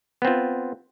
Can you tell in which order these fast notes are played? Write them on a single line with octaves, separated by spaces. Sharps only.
B3 C4 F4